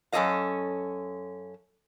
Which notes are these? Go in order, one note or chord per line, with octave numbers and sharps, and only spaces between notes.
F#2 C#4 A4 C#5 D#5 F5